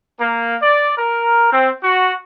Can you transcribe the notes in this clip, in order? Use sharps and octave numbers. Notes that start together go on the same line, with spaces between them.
A#3
D5
A#4
C4
F#4